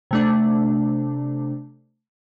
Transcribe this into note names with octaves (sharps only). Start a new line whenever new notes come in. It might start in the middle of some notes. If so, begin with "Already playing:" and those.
C3 A3 D4